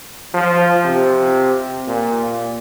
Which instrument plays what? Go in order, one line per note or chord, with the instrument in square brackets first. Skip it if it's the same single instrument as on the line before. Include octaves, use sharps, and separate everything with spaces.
[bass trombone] F3
C3
A#2